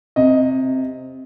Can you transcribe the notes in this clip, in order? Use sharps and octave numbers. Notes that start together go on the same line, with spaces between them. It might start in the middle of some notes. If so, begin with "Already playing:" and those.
C3 D#5